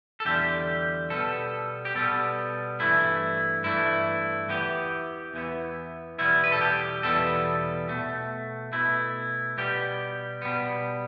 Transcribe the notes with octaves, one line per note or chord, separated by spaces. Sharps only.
A4
E2 D3 G3 G4
B2 G3 B3 A4
G4
B2 G3 B3 A4
G2 E3 A3 E4
G2 E3 A3 E4
E2 E3 B3 G4
E2 E3 B3
E2 B2 G3 B3 E4
B4
A4
G4
E2 B2 G3 B3 A4
B2 A3
B2 A3 E4
B2 G3 B3 G4
B2 G3 B3